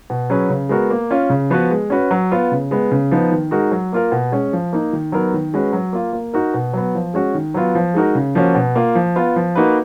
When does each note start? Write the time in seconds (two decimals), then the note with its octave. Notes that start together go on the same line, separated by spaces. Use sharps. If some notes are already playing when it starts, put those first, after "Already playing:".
0.10 B2
0.30 F#3 C#4 G#4 B4
0.50 C#3
0.69 G#3 B3 F#4 A#4
0.90 A#3
1.11 C#4 F4
1.30 C#3
1.50 F3 B3 F#4 B4
1.71 G#3
1.90 C#4 F#4 B4
2.11 F#3
2.31 B3 F4
2.52 C#3
2.71 G#3 B3
2.91 C#3
3.11 F3 B3 D#4
3.32 D#3
3.51 G#3 D#4 F#4 A#4
3.72 F#3
3.93 A#3 F4 A#4
4.12 B2
4.32 G#3 C#4
4.53 F3
4.73 A#3 D#4
4.93 D#3
5.12 F#3 B3 D#4 A#4
5.34 D#3
5.54 G#3 C#4 F#4 B4
5.73 F#3
5.93 A#3 F4
6.13 A#3
6.34 D#4 F#4 A#4
6.54 B2
6.73 F#3 B3
6.95 F3
7.14 G#3 C#4 F#4
7.34 D#3
7.54 F#3 B3 F4
7.75 F3
7.94 G#3 D#4 F#4 A#4
8.15 C#3
8.35 F3 A#3 C#4 F#4
8.55 B2
8.76 A#3 F4
8.95 F3
9.16 B3 F4
9.36 F3
9.55 A#3 D#4 F#4 B4